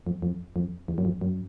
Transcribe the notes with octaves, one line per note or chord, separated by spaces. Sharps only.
F2
F2
F2
E2
F#2
F2
F#2